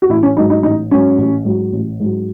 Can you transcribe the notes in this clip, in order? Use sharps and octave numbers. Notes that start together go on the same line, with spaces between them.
F#4
A1 E4
C#4
G#2 F#3 D#4
D#4
A1 D#4
G#2 F#3 C#4
A1
G#2 F#3
A1
G#2 F#3